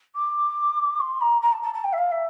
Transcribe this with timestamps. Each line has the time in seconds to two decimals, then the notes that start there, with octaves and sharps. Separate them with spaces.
0.15 D6
1.00 C6
1.20 A#5
1.41 A#5
1.52 A5
1.62 A5
1.73 A5
1.84 G5
1.92 E5
1.97 F5
2.11 E5